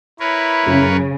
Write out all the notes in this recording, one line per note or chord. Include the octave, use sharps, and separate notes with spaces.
E4 A#4 B4 C#5
F#2 C#3